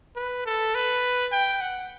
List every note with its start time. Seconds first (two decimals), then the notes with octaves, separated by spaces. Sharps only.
0.16 B4
0.46 A4
0.75 B4
1.32 G5
1.61 F#5